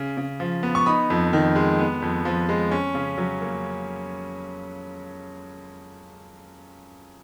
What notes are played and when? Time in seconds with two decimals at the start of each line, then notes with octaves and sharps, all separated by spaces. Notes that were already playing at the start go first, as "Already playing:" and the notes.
Already playing: C#3
0.17 C#3
0.40 F3
0.63 B3
0.75 C#6
0.86 D#4 B5 D#6
1.10 F2
1.33 D#3
1.55 G#3
1.79 B3
2.02 F2
2.25 F3
2.49 G#3
2.71 C#4
2.95 C#3
3.18 F#3
3.41 A#3